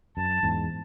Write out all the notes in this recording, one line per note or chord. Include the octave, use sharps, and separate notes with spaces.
F#2 A5
E2 G#2